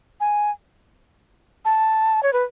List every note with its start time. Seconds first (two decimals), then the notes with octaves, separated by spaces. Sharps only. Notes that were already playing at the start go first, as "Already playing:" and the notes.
0.20 G#5
1.65 A5
2.23 C#5
2.33 B4